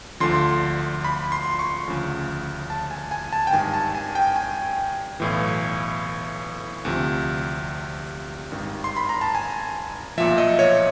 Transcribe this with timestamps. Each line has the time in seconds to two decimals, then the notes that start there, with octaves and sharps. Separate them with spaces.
0.20 D2 D3 F3 C6
1.04 B5
1.32 C6
1.50 C6
1.59 C#6
1.87 D2 C#3 F3
2.70 A5
2.91 G#5
3.11 G#5
3.33 A5
3.47 G5
3.53 G#1 G2 D#3 G#5
3.74 A5
3.95 G#5
4.15 G5
4.36 G#5
5.20 B1 A2 E3
6.85 D2 C3 F3
8.51 G#1 G2 D#3
8.84 C6
8.97 B5
9.09 A#5
9.21 A5
9.35 G#5
10.18 B1 A#2 F3 E5
10.38 D#5
10.59 C#5